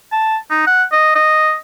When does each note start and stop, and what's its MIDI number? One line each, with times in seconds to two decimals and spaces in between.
0.12 0.37 81
0.51 0.67 63
0.67 0.84 78
0.92 1.12 75
1.15 1.56 75